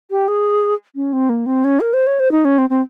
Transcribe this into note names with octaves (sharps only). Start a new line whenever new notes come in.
G4
G#4
C#4
C4
A#3
C4
C#4
A#4
C5
C#5
C5
D#4
C#4
C4
C4